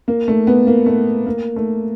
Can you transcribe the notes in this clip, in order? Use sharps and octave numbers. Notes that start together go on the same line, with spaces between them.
A#3
A3
B3
A#3
A3
A#3
A3